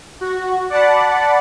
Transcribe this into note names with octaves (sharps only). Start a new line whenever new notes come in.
F#4
D5 F#5 A5 B5